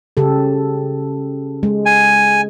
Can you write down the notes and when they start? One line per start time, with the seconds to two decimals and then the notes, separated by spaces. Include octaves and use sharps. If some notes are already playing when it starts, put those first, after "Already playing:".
0.17 C#3 G4 A4
1.63 G#3
1.86 G#5